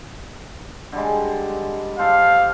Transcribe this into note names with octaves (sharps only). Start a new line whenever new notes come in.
D3 G3 G#3
G4 A4 C5 F5